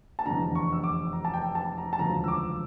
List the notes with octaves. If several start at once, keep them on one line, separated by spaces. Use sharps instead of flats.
A5
F1 E2 D3 A#5
C#6
E6
D6
A#5
A5
G5
A5
A#5
A5
E1 D2 C#3 F3 A#5
E6
D6